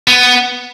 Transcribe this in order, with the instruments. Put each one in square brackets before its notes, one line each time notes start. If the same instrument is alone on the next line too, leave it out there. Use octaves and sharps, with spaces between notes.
[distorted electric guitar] B3